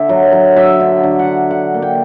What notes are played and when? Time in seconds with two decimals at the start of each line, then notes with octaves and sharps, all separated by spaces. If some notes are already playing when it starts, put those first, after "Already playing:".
Already playing: D3 E5
0.09 F#3
0.32 F#3
0.56 F#3 E5
0.80 D3
1.04 D3
1.19 F#5
1.27 D3
1.50 D3 F#5
1.74 A#3
1.82 G5